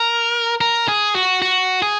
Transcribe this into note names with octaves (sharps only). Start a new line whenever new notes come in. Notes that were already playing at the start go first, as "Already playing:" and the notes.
Already playing: A#4
A#4
G#4
F#4
F#4
G#4